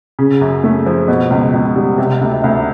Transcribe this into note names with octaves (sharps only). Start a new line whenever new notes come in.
C#3
F#2
A3
F3
B2
C#2
C#2
G3
C3
D2
D2